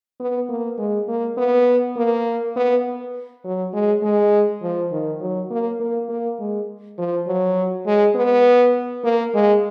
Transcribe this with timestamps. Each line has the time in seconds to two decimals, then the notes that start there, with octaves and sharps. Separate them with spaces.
0.20 B3
0.49 A#3
0.78 G#3
1.08 A#3
1.37 B3
1.96 A#3
2.56 B3
3.44 F#3
3.73 G#3
4.02 G#3
4.62 F3
4.92 D#3
5.20 F#3
5.51 A#3
5.80 A#3
6.09 A#3
6.39 G#3
6.98 F3
7.27 F#3
7.86 G#3
8.15 B3
9.04 A#3
9.34 G#3